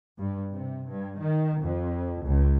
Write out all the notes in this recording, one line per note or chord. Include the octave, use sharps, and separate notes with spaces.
G2
C3
G2
D#3
F2
C#2